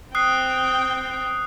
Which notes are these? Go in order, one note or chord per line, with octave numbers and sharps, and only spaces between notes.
C4 G5 D#6 F#6 C7